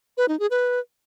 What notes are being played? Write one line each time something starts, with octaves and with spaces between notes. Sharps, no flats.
B4
D#4
G#4
B4